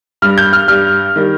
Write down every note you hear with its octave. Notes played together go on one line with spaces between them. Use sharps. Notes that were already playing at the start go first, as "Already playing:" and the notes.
G2 G3 F6
G6
F6
G2 G3 F6
D#3 G3